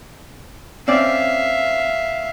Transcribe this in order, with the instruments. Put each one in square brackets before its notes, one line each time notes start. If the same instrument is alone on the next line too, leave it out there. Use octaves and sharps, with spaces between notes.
[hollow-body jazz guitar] C4 C#4 D5 [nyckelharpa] E5 F5